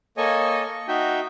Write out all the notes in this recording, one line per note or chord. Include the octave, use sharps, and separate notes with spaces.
A#3 A4 C#5 D#5 G#5 C#6
C#6
D#4 F#4 E5 G5